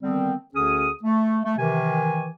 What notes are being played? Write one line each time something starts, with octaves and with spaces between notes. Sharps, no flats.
D3 D#3 G3 B3 C4
D2 D3 C#4 G#4 D#6
A3
A3
C3 D#3 E3 G#5